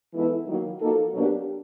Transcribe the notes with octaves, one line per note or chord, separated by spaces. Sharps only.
E3 G#3 B3 E4 A4
D#3 F#3 A#3
F3 A#3 D#4 F#4 A4
B2 F#3 A#3 D4 G4